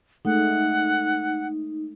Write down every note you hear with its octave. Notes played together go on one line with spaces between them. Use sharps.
G#3 A3 D#4 F#5